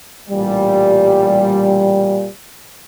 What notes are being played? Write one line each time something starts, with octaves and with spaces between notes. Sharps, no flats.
A1 A#2 G3